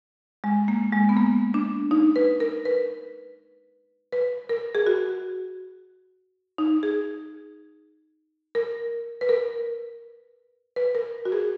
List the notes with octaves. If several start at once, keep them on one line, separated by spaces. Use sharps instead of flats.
G#3
A#3
G#3
B3
A#3
D4
D#4
B4
A#4
B4
B4
A#4
G#4
F#4
D#4
G#4
A#4
B4
A#4
B4
A#4
F#4
G#4